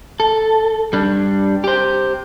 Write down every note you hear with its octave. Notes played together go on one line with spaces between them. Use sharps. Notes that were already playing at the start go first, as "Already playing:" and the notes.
A4
G3 D4
G4 C5